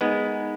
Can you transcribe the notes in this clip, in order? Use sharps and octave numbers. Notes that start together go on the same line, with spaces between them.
G#3 B3 D#4 A#4 E5